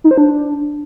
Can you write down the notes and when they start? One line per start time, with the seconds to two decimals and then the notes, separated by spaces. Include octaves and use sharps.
0.04 D#4
0.11 C5
0.18 D4